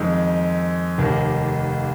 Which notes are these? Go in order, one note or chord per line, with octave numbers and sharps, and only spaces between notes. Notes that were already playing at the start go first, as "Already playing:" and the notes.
Already playing: F2 D#3 G#3 D#4
F1 D#2 D#3 A#3